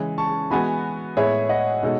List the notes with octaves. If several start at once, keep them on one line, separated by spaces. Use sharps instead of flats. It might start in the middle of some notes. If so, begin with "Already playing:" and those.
Already playing: C#3 E3 G#3 C#4
A5 C#6
E3 G#3 B3 F#4 G#5 B5
A2 G#3 B3 E4 G#4 C#5 E5
D#5 F#5
B2 G#3 D#4 F#4 A4